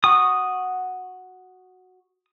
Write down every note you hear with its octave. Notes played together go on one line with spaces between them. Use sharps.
F#4 D#6